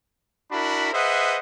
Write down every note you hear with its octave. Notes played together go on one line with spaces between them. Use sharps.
D4 E4 F#4 A#4 B5
G#4 B4 C5 D#5 E5 F#5